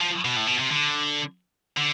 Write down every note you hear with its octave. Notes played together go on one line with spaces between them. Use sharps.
F3
B2
A2
B2
C3
D3
D3